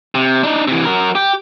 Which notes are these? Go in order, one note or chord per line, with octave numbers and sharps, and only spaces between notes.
C3
D4 D#4
C3 E3
F#3 A#4
G4